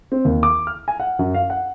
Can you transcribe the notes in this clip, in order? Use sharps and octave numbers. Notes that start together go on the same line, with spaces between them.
C4
D#2
D6
F6
G#5
F#5
F#2
F5
F#5